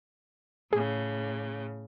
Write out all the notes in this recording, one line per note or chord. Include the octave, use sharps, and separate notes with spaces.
A2 C#3 G#4